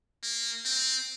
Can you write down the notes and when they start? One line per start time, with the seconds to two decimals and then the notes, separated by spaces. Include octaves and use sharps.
0.23 A#3
0.65 C4